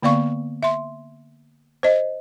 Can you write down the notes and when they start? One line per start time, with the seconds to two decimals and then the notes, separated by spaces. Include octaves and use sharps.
0.03 D3 A#3 B3 D5 F5 C#6
0.63 E5 C6
1.83 C5 D#5